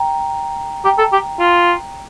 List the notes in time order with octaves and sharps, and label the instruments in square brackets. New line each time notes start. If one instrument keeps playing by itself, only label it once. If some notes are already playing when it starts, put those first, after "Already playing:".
Already playing: [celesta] G5 A#5
[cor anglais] G4 [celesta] G5 A#5
[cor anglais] A4
G4
F4